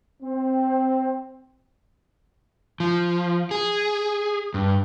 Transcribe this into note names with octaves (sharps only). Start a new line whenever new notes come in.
C4
F3
G#4
G2